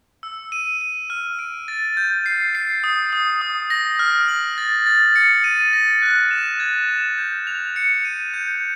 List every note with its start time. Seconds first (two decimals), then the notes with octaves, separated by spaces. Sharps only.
0.23 E6
0.52 D#7
0.81 D#7
1.10 F6
1.39 D7
1.68 A6
1.97 G6
2.26 C7
2.55 C7
2.84 D#6
3.13 D#6
3.41 D#6
3.70 A#6
3.99 F6
4.28 F#7
4.58 A6
4.86 A6
5.15 C#7
5.44 D#7
5.73 A#6
6.02 F#6
6.31 E7
6.60 G#6
6.89 E7
7.18 G6
7.47 F7
7.76 C#7
8.05 D#7
8.34 G6